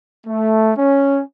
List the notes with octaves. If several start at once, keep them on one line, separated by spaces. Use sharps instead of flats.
A3
C#4